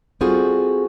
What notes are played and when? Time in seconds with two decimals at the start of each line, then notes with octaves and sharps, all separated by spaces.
0.21 G3 C4 F4 F#4 G#4 A4